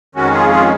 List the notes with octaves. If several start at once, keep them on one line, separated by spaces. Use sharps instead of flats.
F2 D#3 G#3 C#4 F#4
F4 G#4
F4 G#4